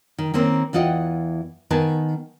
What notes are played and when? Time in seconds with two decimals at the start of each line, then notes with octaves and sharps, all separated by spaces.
0.18 D#3
0.34 D#3 A#3 C4 C#4 D#4
0.73 E2 E3 F4 D#5 F#5 G5
1.70 D#3 B3 A#4 B4 G#5 A5